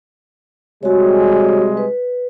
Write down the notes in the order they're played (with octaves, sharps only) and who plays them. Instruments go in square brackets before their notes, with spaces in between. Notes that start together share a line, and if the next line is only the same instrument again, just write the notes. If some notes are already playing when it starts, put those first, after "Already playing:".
[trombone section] C3 G3 G#3 [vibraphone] F#4 C#5
[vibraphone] B4